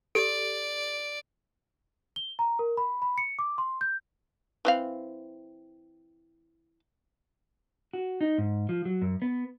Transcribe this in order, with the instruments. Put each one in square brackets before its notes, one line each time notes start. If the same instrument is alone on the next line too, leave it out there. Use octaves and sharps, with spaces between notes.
[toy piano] G4 A4 [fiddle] D5 [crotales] D7
[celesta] G7
A#5
A#4
B5
B5
C#7
D6
C6
G6
[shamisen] E3 C4 F5
[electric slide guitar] F#4
D#4
G#2
F3
F#3
F#2
B3